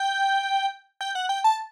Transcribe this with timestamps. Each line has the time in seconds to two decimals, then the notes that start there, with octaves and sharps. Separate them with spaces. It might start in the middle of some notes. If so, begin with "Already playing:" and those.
Already playing: G5
1.01 G5
1.15 F#5
1.29 G5
1.44 A5